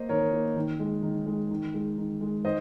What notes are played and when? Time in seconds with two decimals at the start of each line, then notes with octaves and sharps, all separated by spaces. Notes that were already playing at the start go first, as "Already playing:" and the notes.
Already playing: A#3 C5 D#5
0.09 D#3 A#4 C#5
0.32 A#3
0.56 D#3
0.80 G#3
1.03 D#3
1.27 G#3
1.51 D#3
1.74 G#3
1.98 D#3
2.21 G#3
2.44 D#3 C5 D#5